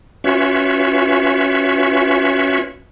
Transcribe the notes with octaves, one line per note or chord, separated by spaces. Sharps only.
C#4 F4 F#4 B4 C#5 E5